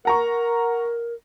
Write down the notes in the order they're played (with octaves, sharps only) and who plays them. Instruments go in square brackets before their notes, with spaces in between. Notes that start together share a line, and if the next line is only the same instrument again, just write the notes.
[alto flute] A#4 [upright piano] F#5 A#5 C#6